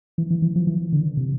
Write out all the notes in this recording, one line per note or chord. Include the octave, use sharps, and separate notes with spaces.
E3
E3
E3
F3
E3
D3
C3